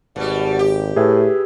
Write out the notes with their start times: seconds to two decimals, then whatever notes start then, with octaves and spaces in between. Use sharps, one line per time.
0.16 G#1 B2 G3
0.59 G4
0.96 A2 G#4 B4 E5